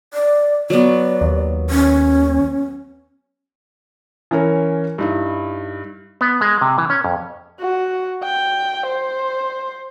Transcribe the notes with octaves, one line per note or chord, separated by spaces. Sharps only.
D5
F#3 B3 D5
D#2
C#4
E3 C#4 A#4 C#5
G2 D#4 E4
B3
G#3
C3
E3
C#4
F2
F#4
G5
C5